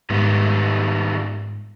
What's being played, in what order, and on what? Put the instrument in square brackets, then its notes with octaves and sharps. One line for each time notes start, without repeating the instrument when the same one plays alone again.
[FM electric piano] G#2 [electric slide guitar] D#3 G3 B3